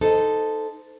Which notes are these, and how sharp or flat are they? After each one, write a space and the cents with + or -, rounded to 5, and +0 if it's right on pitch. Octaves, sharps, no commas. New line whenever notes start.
D#4 -5 A4 +0 C5 -20